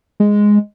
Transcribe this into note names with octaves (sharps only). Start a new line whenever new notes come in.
G#3